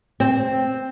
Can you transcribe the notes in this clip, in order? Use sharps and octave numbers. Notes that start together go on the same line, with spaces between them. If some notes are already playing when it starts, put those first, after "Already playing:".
C4